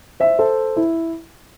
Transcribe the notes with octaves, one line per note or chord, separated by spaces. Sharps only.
C5 E5
A4 C5
E4